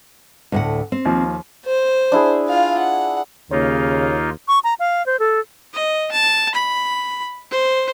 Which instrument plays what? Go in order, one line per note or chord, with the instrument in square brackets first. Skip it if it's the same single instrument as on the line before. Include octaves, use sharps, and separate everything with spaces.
[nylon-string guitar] D2 A2 F#5
C4
[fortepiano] D#2 F3
[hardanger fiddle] C5
[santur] D4 E4 G#4
[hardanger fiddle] F4 F5
F#5
[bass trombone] D#2 [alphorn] C#3 [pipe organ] A#3 D#4 F4 [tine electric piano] C#5
[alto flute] C#6
A#5
F5
C5
A4
[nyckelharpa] D#5
A5
B5
C5